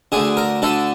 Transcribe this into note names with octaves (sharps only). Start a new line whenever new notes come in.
D2 D3 G#4
A#4
D2 D3 A4